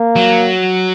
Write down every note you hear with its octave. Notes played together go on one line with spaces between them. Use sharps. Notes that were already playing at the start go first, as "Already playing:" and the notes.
Already playing: A#3
F#3